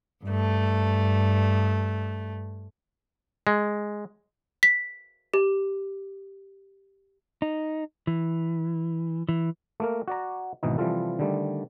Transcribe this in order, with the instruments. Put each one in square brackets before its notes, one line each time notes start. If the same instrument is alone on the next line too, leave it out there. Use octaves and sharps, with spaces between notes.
[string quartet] G2 A3
[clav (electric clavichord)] G#3
[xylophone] B6
G4
[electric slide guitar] D#4
E3
E3
[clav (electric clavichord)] A3 A#3 A#4
F#4 D5 A#5
G#1 B2 E3 D#4
C3 E3 F3 G3 F4 A4
D3 D#3 G3 A3